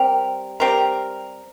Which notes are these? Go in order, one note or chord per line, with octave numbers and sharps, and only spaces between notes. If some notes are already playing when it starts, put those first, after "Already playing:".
Already playing: G3 C4 G4 A#4
G3 C4 G4 A#4